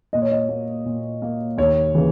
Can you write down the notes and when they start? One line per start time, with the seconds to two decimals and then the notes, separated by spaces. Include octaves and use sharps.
0.13 A#2 D#5
0.22 C#5
0.32 D#5
0.49 A#3
0.85 A#2
1.22 A#3
1.57 D#2 C#5
1.95 C#3 E3 A#3